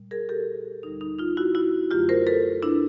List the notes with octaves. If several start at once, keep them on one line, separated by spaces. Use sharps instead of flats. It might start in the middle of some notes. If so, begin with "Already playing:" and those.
Already playing: A#2 G3
G#4 A#4
G4 A4
D2 D3 G3 D#4
D#4
D#4 F4
E4 F#4
E4 F#4
F#2 D3 F#3 A3 F4 G4
A#4 C5
A4 B4
D4 E4